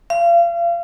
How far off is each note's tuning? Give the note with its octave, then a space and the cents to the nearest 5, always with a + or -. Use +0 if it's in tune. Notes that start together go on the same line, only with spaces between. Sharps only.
F5 -35